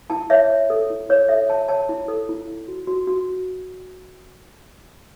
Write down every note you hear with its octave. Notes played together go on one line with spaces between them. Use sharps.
E4 A5
C#5 E5
C#5
A4
E4
E4 C#5
A4 E5
C#5 A5
C#5 A5
E4
A4
E4
E4
F#4
F#4
F#4